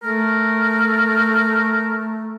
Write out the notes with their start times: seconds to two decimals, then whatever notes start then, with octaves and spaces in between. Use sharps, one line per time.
0.03 A3 A#4